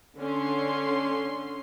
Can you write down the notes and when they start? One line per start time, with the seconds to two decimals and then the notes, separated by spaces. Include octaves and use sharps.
0.19 D3 C#4 C6